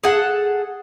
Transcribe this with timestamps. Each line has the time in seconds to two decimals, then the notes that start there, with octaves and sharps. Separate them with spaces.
0.04 G#4 A4 F#5